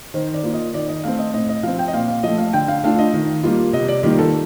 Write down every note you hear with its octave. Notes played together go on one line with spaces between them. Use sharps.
D#3 C5
D5
A#3 F4
D#5
D#3 D5
D#5
A3 C4 F5
D#5
A2 D#5
D#5
F3 C4 F5
G5
D#5
A#2 F5
F5
F3 A3 D#5
F5
D3 G5
F5
A3 D4 F4 F5
D#5
D#3
G3 A#3 F4
C3 D#5
D5
D#3 G3 A#3 F4 G4
A4